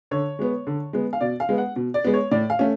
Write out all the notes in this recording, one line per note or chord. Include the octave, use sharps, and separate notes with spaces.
D3 C#5
G#3 B3
D3
G#3 B3
F5
B2 D5
F5
G#3 B3
F#5
B2
D5
G#3 B3
C#5
A2 D5
F5
A3 C#4